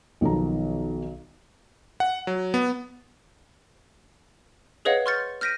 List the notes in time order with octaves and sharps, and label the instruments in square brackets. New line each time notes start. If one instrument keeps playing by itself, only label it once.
[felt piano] B1 D#3 F3 B3 A#5
[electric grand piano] F#5
F#3
B3
[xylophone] G#4 B4 C#5 D#5 F5 F#5
C6 C#6 F6 G6 A6 C#7
F6 G6 A#6 B6 D7 D#7